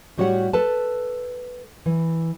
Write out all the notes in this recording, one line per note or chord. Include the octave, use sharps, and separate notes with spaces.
A2 G3 F#4 G4 C#5 F#5
A4 B4 A5
E3